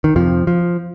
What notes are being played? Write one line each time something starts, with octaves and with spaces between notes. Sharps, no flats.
D#3
F2 C3 F3
F3